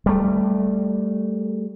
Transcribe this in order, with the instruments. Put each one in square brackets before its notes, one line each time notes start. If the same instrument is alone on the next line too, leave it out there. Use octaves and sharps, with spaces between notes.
[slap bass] G3 A3